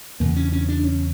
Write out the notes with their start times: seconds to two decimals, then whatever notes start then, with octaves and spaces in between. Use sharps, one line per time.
0.20 E2 C#3 A#3
0.36 C#4
0.53 C#4
0.69 D4
0.84 C#4